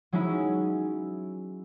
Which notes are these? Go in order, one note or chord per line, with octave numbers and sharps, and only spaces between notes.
F#3 G#3 C#4 D#4 E4